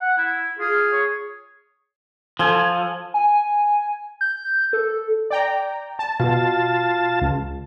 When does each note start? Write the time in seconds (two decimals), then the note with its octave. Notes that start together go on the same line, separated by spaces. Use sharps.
0.02 F#5
0.18 E4
0.59 F4 G#4
0.93 C#5
2.39 F3 A4 G#5
3.14 G#5
4.21 G6
4.73 A4
5.31 D5 G5 A#5
5.99 A5
6.20 B2 F4 A5
7.21 C#2